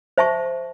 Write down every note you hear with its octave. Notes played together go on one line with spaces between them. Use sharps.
C5 E5 A5 C#6